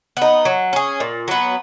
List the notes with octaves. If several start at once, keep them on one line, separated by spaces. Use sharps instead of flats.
B3 D#4
F#3
C#4 G#4
A#2
F#3 B3